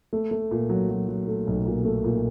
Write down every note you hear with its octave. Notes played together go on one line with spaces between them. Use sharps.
A3
A3
A#2
F#3
F#3
F#3
A3
B1
A#2
A3
A#2